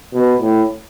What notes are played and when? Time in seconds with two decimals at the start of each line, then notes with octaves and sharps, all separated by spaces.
0.13 B2
0.41 A2